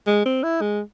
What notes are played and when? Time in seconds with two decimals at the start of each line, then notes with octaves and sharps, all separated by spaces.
0.07 G#3
0.25 C4
0.43 E4
0.61 G#3